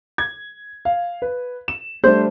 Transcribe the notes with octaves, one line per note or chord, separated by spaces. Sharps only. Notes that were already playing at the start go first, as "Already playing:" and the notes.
G#6
F5
B4
E7
G3 A3 D4 C5